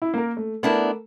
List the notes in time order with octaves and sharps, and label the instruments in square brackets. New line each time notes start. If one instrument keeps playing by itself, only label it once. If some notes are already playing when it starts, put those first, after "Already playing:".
[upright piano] E4
A#3 A#4
A3
[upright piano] A3 A#4 [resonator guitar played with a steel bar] B3 D4 E4